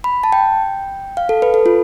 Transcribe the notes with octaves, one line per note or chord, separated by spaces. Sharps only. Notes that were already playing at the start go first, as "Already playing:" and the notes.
B5
A5
G5
F5
A4
B4
A4
F4